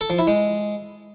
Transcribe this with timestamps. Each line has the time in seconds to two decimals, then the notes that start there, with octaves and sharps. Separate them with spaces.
0.01 A4
0.10 F3
0.19 E4
0.27 G#3